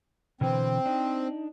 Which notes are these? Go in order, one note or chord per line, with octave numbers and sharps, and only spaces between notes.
B2 D3 E3 C4
D4 D#4